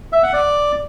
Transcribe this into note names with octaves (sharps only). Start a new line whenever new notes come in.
E5
F#5
D5